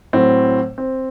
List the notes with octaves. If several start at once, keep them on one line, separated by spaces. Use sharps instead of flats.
A2 F#3 C4
C4